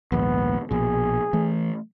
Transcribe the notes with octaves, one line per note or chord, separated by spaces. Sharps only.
A#1 D#2 G#2 B3
A#1 B2 G#4
E3 A3